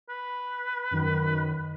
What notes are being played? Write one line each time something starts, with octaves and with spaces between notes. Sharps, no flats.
B4
F#2 D#3